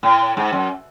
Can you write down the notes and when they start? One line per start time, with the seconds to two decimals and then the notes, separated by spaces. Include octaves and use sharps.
0.03 A2
0.37 G#2
0.53 F#2